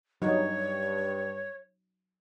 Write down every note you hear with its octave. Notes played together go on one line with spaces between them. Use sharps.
G2 F#3 D#4 C#5